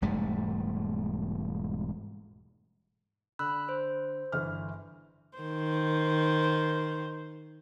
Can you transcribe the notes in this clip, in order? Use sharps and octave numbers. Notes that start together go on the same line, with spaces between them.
E1 G#2 G3 A3
D3 B5 E6 F#6
C5
G1 E3 F6
D#3 C5